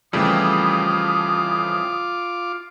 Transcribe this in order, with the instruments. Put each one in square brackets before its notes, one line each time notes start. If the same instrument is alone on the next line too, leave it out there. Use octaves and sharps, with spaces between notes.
[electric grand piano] F2 C#3 A3 [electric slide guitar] E3 G3 [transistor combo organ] F4 D6 [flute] D#6